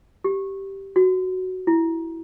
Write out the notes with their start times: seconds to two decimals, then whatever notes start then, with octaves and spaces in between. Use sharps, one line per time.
0.24 G4
0.96 F#4
1.67 E4